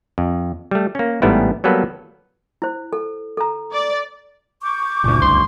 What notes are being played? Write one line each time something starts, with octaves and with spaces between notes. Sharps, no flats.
F2
G3 A3
A#3 C#4
A1 G#2 G3 A3 B3 E4
F#3 G3 A#3 B3 A4 B4
E4 C5
A4
A4 A#5
D5
C#6 D6 G6
F#1 D2 A#2
C2 C6